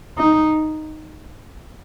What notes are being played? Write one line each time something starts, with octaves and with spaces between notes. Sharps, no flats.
D#4